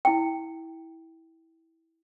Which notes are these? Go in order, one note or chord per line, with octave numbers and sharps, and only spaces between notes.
E4 G5